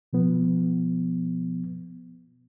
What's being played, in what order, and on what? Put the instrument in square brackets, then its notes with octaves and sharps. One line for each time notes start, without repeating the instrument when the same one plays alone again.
[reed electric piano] B2 F3 B3